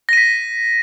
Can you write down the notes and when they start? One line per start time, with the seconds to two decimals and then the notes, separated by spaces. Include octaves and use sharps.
0.09 A#6
0.13 D#7
0.17 B6